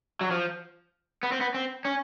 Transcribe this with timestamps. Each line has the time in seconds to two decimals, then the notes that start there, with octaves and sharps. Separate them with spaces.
0.21 F#3
0.31 F3
1.23 B3
1.32 C4
1.41 B3
1.54 C4
1.85 C#4